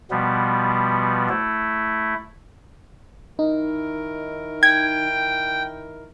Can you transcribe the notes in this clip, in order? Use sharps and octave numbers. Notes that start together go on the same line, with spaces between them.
B2 F3 G3 B3
A3 E4
D#3 D#4 E4 A#4
G5 G#6